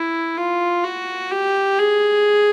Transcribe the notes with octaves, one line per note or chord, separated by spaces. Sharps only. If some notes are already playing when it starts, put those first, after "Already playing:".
Already playing: E4
F4
F#4
G4
G#4